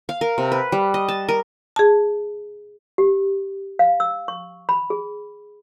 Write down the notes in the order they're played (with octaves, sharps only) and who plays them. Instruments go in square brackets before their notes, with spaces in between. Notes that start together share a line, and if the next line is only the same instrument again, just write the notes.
[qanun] F5
A#4
C3
B4
G3
D#5
A5
A#4
[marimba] G#4 A5
[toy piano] G4
F5
E6
C#6
B5
G#4